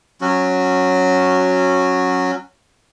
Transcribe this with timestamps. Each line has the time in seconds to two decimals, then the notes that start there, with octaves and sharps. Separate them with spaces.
0.21 F#3 C#4 F#4